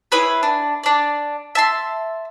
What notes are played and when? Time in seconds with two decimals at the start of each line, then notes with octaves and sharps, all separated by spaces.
0.12 E4 G#4 B4 C#5
0.43 D4
0.83 D4 D5
1.55 E5 A5 C6